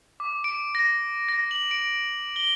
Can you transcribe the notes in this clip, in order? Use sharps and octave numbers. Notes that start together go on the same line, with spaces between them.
D6
D7
A#6
A#6
F#7
D7
G7